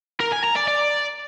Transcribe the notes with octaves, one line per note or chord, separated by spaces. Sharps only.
A#4
G#5
A#5
D5
D5